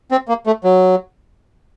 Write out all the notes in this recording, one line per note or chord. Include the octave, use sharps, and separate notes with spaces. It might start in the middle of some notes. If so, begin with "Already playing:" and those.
C4
A#3
A3
F#3